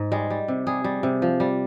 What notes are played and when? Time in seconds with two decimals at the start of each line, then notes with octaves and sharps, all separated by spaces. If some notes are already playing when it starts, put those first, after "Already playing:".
Already playing: G#2
0.12 G3 G#3
0.30 G3
0.48 C3
0.67 G3 G#4
0.84 G3
1.03 C3
1.22 F3
1.40 G3